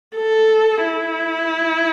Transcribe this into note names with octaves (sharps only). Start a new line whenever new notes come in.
A4
E4